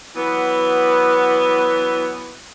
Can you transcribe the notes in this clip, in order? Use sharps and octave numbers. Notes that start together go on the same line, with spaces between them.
E3 F#3 B3